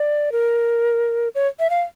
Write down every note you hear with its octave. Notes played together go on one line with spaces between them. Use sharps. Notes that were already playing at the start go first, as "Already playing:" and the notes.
Already playing: D5
A#4
C#5
E5
F5